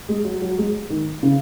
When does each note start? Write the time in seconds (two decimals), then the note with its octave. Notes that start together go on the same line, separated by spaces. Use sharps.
0.09 G#3
0.25 F#3
0.42 F#3
0.58 G#3
0.90 D#3
1.23 C#3